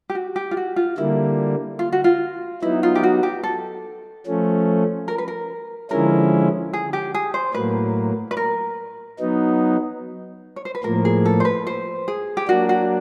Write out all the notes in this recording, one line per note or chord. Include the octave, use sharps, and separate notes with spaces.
G4
F#4
G4
F4
F#4
F4
D3 G3 A#3 E4
F4
F#4
F4
F#3 B3 D#4 E4
F4
G4
F#4
G4
A4
F3 A3 C#4
A#4
B4
A#4
D3 F3 G#3 C#4 E4 A#4
G#4
G4
G#4
C5
A2 F#3 A#3 B4
B4
A#4
F#3 B3 D#4
C#5
C5
B4
A2 F3 A#3 A#4
G#4
A4
C5
B4
C5
G#4
G4
F#3 A#3 D4 F#4
F#4